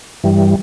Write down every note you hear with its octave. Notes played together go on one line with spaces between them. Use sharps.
G2 E3 G3